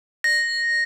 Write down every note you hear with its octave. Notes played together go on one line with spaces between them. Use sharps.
A#6